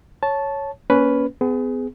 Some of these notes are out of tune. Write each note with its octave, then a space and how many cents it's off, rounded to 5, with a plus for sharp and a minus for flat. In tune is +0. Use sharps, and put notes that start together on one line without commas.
C#5 +0 A5 -10
A#3 +25 C#4 +20 B4 +0
B3 +40 G#4 +0